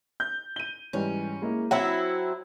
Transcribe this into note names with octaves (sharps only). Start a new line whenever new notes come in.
G6
D#7 G7
G#2 E3 G3 C#4
G#3 A#3 E4
F#3 C4 E4 F#5